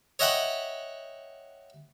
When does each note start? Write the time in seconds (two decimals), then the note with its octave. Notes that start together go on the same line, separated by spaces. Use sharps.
0.19 C#5 D#5 E5 F#5 G5 B5